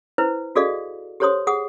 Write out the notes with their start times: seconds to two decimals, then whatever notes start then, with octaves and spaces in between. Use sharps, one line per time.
0.18 E4 B4 C5
0.56 F#4 G#4 A4 D5 D#5 F5
1.20 G4 A4 C5 C#5 C6 D#6
1.47 G#4 F#5 D#6